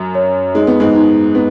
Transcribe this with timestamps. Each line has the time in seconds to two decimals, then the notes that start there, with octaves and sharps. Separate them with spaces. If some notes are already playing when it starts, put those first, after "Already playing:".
Already playing: F#2
0.15 C#5
0.54 G#3 D#4
0.67 B3
0.80 G#2 G#3
0.95 D#4
1.35 B3